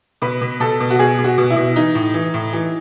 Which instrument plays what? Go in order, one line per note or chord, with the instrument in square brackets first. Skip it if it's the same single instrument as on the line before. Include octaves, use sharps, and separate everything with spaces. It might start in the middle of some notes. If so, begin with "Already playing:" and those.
[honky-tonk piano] B2 B4
B2
B2 A4
B2
F#4
B2 G#4
B2
F#4
B2
E4
B2
E3 D#4
A2
E3
A2
E3